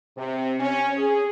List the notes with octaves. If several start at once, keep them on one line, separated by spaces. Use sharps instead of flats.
C3
C#4
G#4